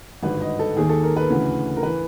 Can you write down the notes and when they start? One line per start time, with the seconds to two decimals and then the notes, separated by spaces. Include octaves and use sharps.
0.23 G#1 G2 D3 B4
0.41 D#5
0.59 A4
0.76 D#2 D#3 G#4
0.89 A4
1.03 A#4
1.16 B4
1.29 D2 C#3 E3
1.77 A#4
1.83 E3 B4